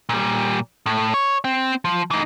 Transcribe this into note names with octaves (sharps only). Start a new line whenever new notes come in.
A#2 G3
A2
C#5
C4
F3
E3 D#4